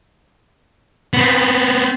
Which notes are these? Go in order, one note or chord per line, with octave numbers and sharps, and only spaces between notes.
B3 C4